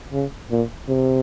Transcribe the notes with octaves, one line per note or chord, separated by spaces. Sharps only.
C#3
A#2
C3